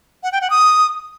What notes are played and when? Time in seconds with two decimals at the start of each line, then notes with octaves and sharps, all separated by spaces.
0.23 F#5
0.32 G5
0.41 F#5
0.50 D#6